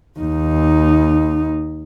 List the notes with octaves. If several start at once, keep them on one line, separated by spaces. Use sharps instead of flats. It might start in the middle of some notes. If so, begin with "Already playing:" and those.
D#2 D#4